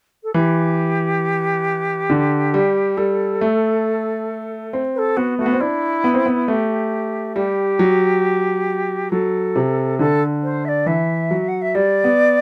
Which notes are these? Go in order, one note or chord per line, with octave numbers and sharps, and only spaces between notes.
A4
E3 G4
D3
G3
G3 A4
A3
C4
B4
A4
B3 F#4
A3 F#4
B3
C4
D4 E4
B3
C4
B3
A3 G4
G3 G4
F#3
F#3 A4
C3
D3 A4
C5
E5
D5
E3 E5
F#3
F#5
E5
G3 D5
B3